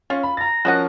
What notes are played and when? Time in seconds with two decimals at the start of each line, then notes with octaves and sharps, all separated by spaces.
0.10 C#4 F4
0.23 B5
0.37 A#5 A6 A#6
0.65 F3 C#4 F#4 A#4 D#5 F#5